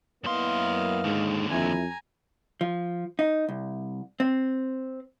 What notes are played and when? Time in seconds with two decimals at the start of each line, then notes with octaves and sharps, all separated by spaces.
0.24 F#2 A#3 B3 E4 D#5 F5 C6
1.04 D#2 G#2 D3
1.50 F2 E4 G#5 A#5
2.61 F3
3.19 D#4
3.49 C2
4.20 C4